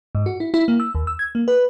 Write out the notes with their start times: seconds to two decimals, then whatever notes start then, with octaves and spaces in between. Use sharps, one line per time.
0.15 G#2
0.26 F#4
0.40 E4
0.54 E4
0.68 A#3
0.80 E6
0.95 D#2
1.07 E6
1.19 G#6
1.35 A#3
1.48 B4